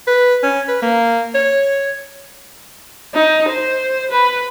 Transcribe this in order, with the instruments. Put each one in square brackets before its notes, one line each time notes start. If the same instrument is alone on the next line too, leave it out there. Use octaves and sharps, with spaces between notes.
[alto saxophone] B4
C#4
B4
A#3
C#5
[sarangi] D#4
C5
B4